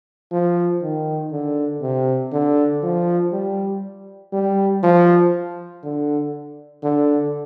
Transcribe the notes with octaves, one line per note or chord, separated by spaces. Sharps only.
F3
D#3
D3
C3
D3
F3
G3
G3
F3
D3
D3